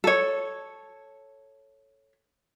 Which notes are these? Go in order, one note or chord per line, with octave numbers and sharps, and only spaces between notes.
A4 C#5